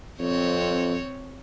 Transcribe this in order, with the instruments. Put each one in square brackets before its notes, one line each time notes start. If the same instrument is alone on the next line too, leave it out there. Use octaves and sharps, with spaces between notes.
[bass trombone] F2 [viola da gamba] C4 C#5